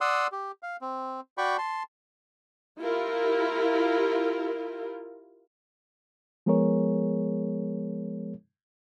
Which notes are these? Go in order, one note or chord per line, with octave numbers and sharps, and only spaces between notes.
D5 F#5 C6 D#6 E6
G4
F5
C4
F#4 D5 G5 B5 C#6
A5 C6
E4 F4 G4 A#4
F3 G#3 B3 G#4 A#4 C#5